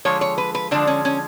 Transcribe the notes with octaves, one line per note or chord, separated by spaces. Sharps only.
D3 F3 G#3 C#5
C#5
B4
B4
D3 F3 G#3 D4
C#4
C#4